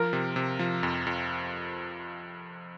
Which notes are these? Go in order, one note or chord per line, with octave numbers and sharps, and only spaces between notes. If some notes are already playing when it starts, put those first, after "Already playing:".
Already playing: F3 A#4
C3
C3
F3
F2
F2